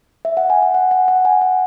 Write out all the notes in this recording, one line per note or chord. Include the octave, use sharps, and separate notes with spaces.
E5
F#5
G#5
F#5
F#5
F#5
F#5
G#5
F#5